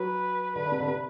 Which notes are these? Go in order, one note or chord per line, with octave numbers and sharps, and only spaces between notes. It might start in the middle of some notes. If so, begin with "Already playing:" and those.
Already playing: F#3 B4
D3 B4
D3
C3
D3
C3